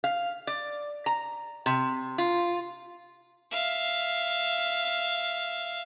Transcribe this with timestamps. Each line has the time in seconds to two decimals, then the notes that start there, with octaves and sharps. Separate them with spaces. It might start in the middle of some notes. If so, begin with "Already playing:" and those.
0.04 F5
0.47 D5
1.06 A#5
1.66 C3
2.18 F4
3.51 E5 F5